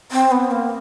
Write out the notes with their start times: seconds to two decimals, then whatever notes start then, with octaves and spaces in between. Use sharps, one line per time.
0.12 C4
0.31 B3
0.51 A#3